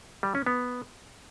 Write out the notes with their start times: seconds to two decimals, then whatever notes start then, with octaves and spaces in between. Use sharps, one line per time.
0.23 G3
0.35 C#4
0.46 B3